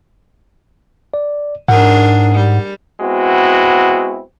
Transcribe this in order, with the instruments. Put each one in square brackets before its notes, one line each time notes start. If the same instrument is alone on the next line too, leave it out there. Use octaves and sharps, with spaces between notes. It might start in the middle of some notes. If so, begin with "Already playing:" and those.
[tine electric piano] D5
[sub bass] G#2 [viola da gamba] D4 G#4 A#4 [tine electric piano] F#5
[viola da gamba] G3
[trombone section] G#3 B3 C4 E4 F#4